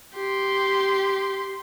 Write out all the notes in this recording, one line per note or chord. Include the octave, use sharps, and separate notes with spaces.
G4 C6